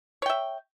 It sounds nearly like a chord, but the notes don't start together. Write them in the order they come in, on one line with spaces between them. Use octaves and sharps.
C#5 G5 E5